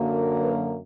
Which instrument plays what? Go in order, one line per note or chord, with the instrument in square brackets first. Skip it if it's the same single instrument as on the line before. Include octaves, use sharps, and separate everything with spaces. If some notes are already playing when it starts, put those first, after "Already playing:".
Already playing: [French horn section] F#2 D3 F#3 A#3
B4